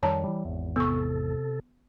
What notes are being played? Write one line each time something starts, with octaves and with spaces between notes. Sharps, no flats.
F2 D#3 G3 C#5 A5 A#5
E3 G3
G#1 E2
C3 B3 A4 C#6